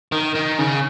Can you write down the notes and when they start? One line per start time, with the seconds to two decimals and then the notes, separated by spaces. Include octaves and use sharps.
0.12 D#3
0.35 D#3
0.58 C#3